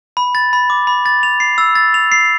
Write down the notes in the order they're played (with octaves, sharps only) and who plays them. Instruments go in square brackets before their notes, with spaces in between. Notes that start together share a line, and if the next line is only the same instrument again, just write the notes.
[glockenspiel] B5
A6
B5
D6
B5
A6
F7
C7
E6
A6
F7
C7